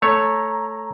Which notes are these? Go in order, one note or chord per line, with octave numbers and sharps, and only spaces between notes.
A3 C#5 A#5